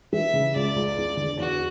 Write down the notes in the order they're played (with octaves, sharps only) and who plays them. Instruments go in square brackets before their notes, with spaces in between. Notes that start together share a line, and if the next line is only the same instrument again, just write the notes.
[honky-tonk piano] E3 [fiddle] E5
[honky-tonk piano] C#3
[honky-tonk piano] C#2 [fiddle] D5
[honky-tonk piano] C#2
E2
D3
[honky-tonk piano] E2 [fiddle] F#4